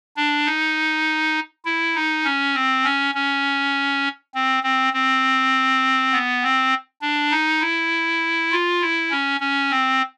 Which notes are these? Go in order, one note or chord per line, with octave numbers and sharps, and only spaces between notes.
D4
D#4
E4
D#4
C#4
C4
C#4
C#4
C4
C4
C4
B3
C4
D4
D#4
E4
F4
E4
C#4
C#4
C4